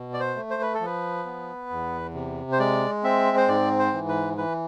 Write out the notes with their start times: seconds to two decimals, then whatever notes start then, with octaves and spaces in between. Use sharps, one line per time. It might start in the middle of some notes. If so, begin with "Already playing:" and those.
Already playing: B2
0.13 D5
0.20 C5
0.36 A3
0.50 C5
0.62 B4
0.74 A4
0.80 F3 B4
1.25 B3
1.70 E2
2.14 C3
2.52 C5
2.59 G#3 D5
3.04 C4 E5
3.37 C5
3.48 G#2 D5
3.79 C5
3.94 E3
4.08 B4
4.38 E3 B4